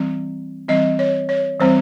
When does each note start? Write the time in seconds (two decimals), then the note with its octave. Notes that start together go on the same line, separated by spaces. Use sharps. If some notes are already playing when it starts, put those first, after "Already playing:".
Already playing: E3 G3 C4
0.68 E3 G3 C4 D#5
0.99 C#5
1.29 C#5
1.60 E3 G3 C4 C5